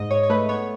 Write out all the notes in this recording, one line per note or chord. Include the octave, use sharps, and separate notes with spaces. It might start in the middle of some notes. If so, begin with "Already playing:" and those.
Already playing: G#2 D#5
G#2 C#5
C#5
A3 B4
B3 C#5